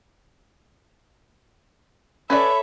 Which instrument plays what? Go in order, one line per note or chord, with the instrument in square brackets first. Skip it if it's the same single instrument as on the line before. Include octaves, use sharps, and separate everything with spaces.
[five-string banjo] C#4 B4 D5 [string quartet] A4 C#5 E5 [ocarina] B5